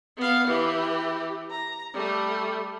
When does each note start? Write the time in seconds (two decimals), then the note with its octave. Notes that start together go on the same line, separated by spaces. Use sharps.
0.17 B3 F5
0.48 E3 G4
1.50 A#5
1.94 G3 A3